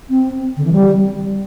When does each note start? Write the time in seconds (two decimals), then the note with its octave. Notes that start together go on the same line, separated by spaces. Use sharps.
0.10 C4
0.57 D3
0.65 E3
0.72 G3